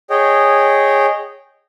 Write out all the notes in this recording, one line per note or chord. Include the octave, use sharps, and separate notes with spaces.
G#4 C#5 D#5 G5